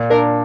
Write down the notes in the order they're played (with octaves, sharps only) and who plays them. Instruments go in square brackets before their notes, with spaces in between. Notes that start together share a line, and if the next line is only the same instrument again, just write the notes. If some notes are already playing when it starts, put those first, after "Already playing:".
Already playing: [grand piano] A#2
[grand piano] D4 [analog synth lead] A#4